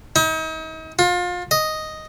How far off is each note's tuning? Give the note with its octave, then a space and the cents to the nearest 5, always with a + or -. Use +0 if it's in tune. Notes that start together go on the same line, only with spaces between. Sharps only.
D#4 +40
F4 +30
D#5 +0